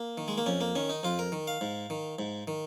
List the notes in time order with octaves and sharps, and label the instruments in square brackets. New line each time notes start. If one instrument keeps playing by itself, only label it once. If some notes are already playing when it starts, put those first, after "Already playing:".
Already playing: [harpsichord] A#3
D#3
G#3
A#3
F2 C#4
A#3
D#3 C#4
D#4
F2 F4
A#4
D#3
F5
G#2
D#3
G#2
D#3